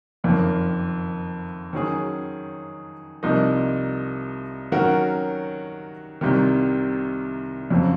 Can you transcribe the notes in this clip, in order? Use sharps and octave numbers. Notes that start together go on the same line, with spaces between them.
F#1 F2 D#3 A#3
D#3 F#3 C#4 G#4
C2 C3 F3 A#3 D#4
D#3 F#3 C#4 F#4 A#4
C2 C3 D#3
F2 C#3 F#3 C4